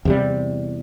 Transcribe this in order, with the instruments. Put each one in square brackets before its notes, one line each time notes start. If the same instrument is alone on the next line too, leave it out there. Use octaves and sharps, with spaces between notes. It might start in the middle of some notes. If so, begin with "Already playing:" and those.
[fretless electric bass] E2 C3 G3